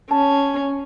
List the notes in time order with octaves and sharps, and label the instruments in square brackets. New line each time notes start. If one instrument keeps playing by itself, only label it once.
[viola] C#4 [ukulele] A5